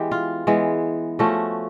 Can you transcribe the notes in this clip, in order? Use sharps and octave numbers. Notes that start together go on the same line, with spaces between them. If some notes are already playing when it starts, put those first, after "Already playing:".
Already playing: E3 G#3 B3 G4
F4
E3 G#3 B3
F3 A3 C#4 F#4